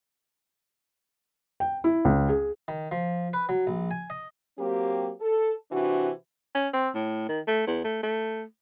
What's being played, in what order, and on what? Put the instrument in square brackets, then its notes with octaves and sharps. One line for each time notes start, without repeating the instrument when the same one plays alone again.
[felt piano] G5
E4
C#2
G#4
[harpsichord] D#3
F3
B4
F#3
A#1
G#5
D#5
[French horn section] F#3 A#3 C4 G4
A4
C3 E3 D4 F#4
[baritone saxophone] C#4
C4
A2
D#3
A3
E2
A3
A3